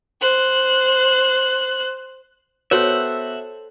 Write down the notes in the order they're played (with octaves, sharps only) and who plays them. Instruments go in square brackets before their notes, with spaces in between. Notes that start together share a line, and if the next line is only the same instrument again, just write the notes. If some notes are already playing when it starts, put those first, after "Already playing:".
[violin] C5 F#6
[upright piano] B3 F#4 [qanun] A4 C5 G5 [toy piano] C#5 [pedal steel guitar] E5 F#5